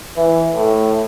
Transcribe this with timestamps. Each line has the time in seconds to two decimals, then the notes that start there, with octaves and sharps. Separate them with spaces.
0.17 E3
0.54 A2